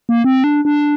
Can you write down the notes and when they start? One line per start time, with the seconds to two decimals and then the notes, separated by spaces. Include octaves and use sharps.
0.09 A#3
0.24 C4
0.44 D4
0.65 D4